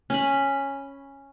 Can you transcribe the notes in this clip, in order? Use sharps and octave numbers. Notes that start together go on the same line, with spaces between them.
C#4 B5